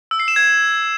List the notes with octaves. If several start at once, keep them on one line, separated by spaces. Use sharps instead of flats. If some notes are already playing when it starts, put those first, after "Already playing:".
E6
C7
E7
G#6